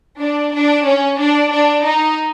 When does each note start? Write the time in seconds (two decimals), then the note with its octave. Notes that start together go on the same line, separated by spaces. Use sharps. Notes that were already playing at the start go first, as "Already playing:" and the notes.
0.19 D4
0.53 D4
0.86 C#4
1.19 D4
1.52 D4
1.85 D#4